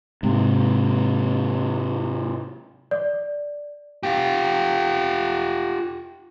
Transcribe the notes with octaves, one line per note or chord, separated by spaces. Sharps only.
G#2 C3
D5
F4 G4